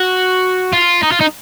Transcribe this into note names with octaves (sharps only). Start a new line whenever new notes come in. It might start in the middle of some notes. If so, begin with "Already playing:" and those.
Already playing: F#4
F4
D#4
F4
D#4